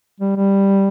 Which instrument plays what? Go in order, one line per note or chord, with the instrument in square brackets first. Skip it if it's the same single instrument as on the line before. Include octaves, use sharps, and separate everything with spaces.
[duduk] G3
G3